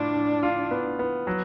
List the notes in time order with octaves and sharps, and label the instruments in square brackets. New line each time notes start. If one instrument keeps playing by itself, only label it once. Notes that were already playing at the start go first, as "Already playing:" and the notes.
Already playing: [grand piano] A2 F4 [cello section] D4
[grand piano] A2
F4
B3
B3
F#3